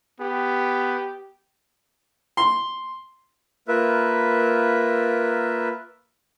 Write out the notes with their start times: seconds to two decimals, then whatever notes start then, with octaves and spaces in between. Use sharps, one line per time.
0.20 B3 G4
2.37 C6
3.68 A#3 F4 A#4 B4 E5